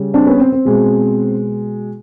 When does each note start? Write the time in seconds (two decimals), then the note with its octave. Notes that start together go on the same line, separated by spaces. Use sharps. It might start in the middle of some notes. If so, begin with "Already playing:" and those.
Already playing: C#3 G3
0.14 C4 D4
0.27 B3 C#4
0.40 C4
0.52 C4
0.65 B2 G#3